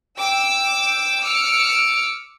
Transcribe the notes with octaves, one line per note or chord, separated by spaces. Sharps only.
G5 D6 E6
D6 E6 F6 C#7 D7